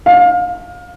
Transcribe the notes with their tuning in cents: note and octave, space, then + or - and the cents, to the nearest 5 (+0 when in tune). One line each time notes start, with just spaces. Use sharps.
F5 +30